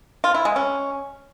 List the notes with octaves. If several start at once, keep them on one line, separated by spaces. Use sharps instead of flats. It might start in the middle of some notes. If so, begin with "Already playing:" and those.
F4
E4
G#3
C#4